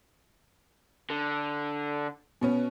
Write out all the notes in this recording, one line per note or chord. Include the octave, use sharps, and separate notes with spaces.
D3
B2 B3 C#4